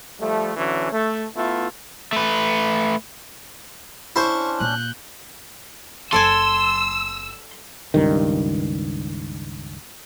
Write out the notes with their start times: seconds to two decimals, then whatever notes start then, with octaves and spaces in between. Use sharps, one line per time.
0.20 F3 G3 A3
0.56 D3 E3 F#3 C#4
0.93 A3
1.36 A3 B3 E4 F4
2.13 A3 B4
4.16 C#4 D4 E4 C5 C#6
4.60 A#2 F#6 G6
6.12 F#1 F#3 A4 D5 G#5 C6 E6
7.94 C#2 G2 D#3